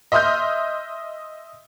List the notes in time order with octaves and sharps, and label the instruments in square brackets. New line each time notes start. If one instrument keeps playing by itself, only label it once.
[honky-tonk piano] D#5 E5 C6 D#6 F6 G6